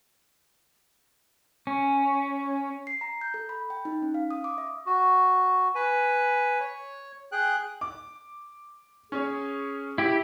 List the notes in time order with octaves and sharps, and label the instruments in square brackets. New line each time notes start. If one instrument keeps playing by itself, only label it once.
[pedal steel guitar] C#4
[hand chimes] C7
A#5
G6
A4
B5
G5
D#4
C#4
F5
D#6
D6
E5
[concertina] F#4
B4 G#5
C#5
G#4 G5 F#6
[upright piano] D6
[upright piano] C#4 C#5 [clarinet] G#4
[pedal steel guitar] E4 G4